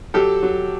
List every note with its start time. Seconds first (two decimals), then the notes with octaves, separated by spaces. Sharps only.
0.14 F#3 G4 A4
0.43 F#3